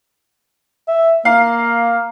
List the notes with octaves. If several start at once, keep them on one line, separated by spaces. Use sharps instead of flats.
E5
A#3 F5